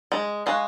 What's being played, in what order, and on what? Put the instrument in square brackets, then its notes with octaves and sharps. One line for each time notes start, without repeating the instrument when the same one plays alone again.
[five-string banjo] G#3
[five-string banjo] G#3 [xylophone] F5 G#5 C#6 F#6